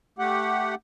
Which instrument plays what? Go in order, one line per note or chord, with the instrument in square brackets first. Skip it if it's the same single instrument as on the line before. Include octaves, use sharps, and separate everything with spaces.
[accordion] A3 G4 F#5